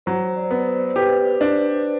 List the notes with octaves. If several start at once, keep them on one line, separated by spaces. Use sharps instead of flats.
F#3 C5
D5
B3
C5
G4 B4
D4